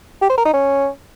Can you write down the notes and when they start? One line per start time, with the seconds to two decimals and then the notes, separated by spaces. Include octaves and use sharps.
0.22 G4
0.30 C5
0.38 A#4
0.46 D#4
0.54 C#4